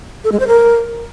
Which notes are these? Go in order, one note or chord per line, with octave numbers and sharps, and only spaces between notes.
A4
G#3
C5
A#4